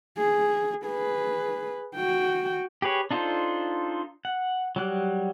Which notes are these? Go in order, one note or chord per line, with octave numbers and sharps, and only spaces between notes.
G#4
G#4 B4
F#4 G5
G4 G#4 B4 C#5
D4 D#4 F4 A4 C5
F#5
F#3 G3 F#6